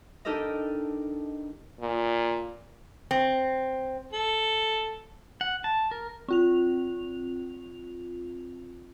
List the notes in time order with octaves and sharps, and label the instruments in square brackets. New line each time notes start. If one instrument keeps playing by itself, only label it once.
[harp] D4 D#4 G4 A4 A#4 D#5
[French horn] A#2
[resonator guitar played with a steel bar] C4
[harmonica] A4
[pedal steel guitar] F#5
A5
A#4
[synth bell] C4 F4 F7